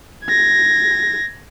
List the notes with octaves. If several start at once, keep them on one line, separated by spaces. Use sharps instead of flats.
G#6 A#6